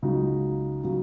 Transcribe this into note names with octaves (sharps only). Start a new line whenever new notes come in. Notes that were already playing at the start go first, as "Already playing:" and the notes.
C#2 C#3 F#3 D#4 F#4
C#3 F#3 D#4 F#4